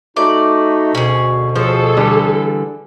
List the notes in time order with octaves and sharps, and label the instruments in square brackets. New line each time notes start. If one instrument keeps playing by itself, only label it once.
[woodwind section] A3 D#4 F#4 [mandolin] D5
[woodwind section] D2 B2 [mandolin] C#4 G#4
[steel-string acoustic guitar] F3 [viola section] G#4 A4 [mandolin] C5
[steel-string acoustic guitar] D3 E3 G3